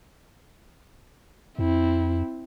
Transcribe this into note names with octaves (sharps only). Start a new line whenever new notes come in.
F2 C4 E4